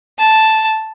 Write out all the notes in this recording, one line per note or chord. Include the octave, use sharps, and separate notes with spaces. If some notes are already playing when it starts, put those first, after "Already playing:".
A5